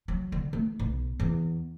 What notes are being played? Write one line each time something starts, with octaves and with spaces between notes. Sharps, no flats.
F#3
D3
A3
B1
E2